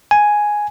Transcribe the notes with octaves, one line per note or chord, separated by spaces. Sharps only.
G#5